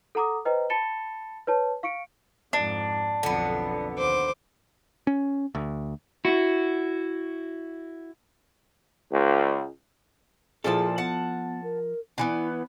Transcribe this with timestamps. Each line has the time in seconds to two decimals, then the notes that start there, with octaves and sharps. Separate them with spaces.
0.15 A4 F#5 A#5 D6 D#6
0.45 B4 C5 D#5 G5 A#5
0.70 A5 B5 A6 C#7 E7 G7
1.47 B4 C#5 A5
1.83 F5 C#6 C#7 D7
2.53 F2 G#2 D4
3.23 B1 F2 D3 B3
3.97 D#2 C5 D6
5.07 C#4
5.55 D2
6.25 E4 F#4
9.12 C#2
10.64 A#2 F3 E4 F#4 G#4 A4 A5
10.98 B3 F#5 A5
11.63 A#4
12.18 D3 E3 B3 E4